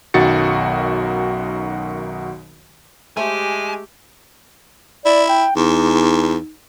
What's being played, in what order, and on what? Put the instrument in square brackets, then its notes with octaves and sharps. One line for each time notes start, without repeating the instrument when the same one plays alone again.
[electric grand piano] B1 F#2 D#3 F#4 A6 C#7
[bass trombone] G#3 [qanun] A3 C5 E5 [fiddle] G4 [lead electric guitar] G#5
[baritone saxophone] E4 [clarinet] D5
[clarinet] G5
[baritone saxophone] E2 [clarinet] D#4